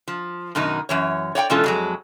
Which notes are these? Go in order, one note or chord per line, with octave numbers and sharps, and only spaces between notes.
F3
F#2 B2 D#3 D#4
F#2 E3 C#5
C#5 D5 F#5 G5
B2 E3 G#3 C#4 F4 A4
F2 F#3 G#3